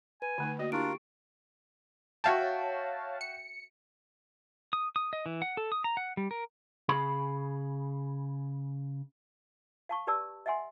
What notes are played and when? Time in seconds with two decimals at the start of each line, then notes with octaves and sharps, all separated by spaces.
0.22 B4 G#5
0.38 D3 A3 D#4
0.59 A#3 F#4 D5 D#5
0.72 D4 E4 F4 G4 A#4 C#6 D7
2.24 F#4 C#5 E5 F5 G5 A5
3.21 C#7
4.73 D#6
4.96 D#6
5.13 D#5
5.26 E3
5.42 F#5
5.57 A4
5.72 D#6
5.84 A#5
5.97 F#5
6.17 G3
6.31 A#4
6.89 C#3 G#4 B5
9.89 F5 A5 C#6
10.07 G4 B4 D5 A5 E6
10.46 D#5 E5 F#5 G#5 C6